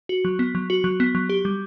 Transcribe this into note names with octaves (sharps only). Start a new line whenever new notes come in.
F#4
F#3
B3
F#3
F#4
F#3
B3
F#3
G4
G3